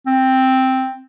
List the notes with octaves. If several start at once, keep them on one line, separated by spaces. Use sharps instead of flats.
C4